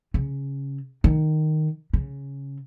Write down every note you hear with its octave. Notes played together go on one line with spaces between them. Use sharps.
C#3
D#3
C#3